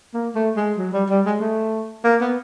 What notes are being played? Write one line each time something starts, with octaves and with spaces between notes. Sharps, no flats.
A#3
A3
G#3
F#3
G3
G3
G#3
A3
A#3
B3